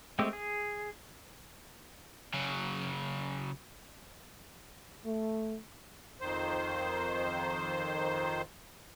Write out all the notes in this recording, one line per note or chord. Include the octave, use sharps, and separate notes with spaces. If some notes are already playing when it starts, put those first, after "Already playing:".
G#3 A3 C4 G4
G#4
C#3 F#3
A3
F2 D#3 C5